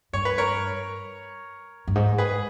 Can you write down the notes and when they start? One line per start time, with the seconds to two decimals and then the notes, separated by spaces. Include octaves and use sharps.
0.13 G2 C#5
0.25 B4
0.38 A#4 C#5
1.88 G2
1.95 G#2
2.18 G#4 B4